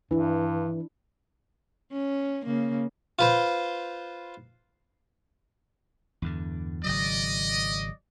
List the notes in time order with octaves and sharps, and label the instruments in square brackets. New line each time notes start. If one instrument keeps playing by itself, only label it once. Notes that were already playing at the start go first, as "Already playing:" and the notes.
[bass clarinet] G2 [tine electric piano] E3 [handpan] D4 E4
[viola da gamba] C#4
C#3 A#3
[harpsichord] F4 B4 C5
[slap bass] E2 G2 D3
[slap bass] G#1 C#3 F#3 [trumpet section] D5 D#5